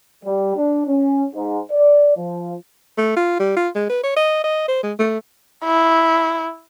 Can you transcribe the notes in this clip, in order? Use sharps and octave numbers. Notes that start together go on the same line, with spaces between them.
G3
D4
C#4
G#2
D5
F3
A3
F4
G3
F4
G#3
B4
C#5
D#5
D#5
C5
G#3
A3
E4